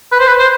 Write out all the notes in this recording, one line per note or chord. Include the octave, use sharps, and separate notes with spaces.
B4
C5
B4
C5